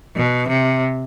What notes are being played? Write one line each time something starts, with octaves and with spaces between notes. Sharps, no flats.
B2
C3